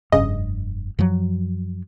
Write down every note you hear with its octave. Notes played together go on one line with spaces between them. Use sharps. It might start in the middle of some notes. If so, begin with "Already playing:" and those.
F1 G2 C#3 D#5
F#2 F3 F#3